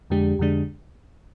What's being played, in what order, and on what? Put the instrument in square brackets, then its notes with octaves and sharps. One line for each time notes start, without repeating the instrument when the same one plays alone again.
[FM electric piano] F2 D3 G#3 D4 G4
F2 D3 G#3 D4